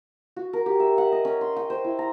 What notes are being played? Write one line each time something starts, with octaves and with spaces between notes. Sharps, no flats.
F#4
A#4
G4
E5
F#5
D#5
C#4
C6
G5
C5
E4
A#5